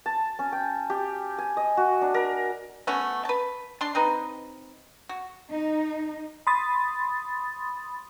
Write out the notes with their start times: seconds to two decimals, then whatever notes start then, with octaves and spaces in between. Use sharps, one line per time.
0.06 A5
0.39 C#4
0.52 G5
0.90 G4
1.38 G#5
1.57 D#5
1.77 F#4
2.01 D4
2.14 A#4
2.87 A3 B3 C#4 F#4
3.25 B4 A5
3.81 D4 A5 C6
3.95 C4 D#4 B4
5.09 F#4
5.51 D#4
6.47 B5 C6 D#6 A6